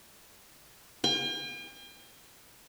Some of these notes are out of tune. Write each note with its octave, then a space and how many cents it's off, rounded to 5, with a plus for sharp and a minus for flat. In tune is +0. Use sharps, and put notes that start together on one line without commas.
G5 +45